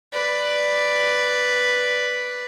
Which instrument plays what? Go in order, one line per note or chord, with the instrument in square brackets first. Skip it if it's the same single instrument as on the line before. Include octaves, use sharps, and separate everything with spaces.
[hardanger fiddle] B4 D5